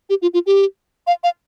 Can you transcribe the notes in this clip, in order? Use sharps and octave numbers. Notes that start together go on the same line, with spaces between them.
G4
F4
F4
G4
F5
F5